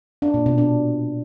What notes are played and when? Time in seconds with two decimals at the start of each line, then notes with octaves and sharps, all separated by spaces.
0.22 D4
0.34 A#2
0.46 B2
0.58 D4